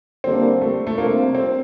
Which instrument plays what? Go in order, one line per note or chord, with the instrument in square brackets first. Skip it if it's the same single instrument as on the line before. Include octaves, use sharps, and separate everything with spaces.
[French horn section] D3 G3 A#3 D4 [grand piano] C4
[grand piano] A3
A3
[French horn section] C3 G3 D4 F4 C5 [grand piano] A#3
[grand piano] C4